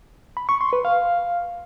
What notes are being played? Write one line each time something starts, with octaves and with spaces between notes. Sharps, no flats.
B5
C#6
C6
B4
F5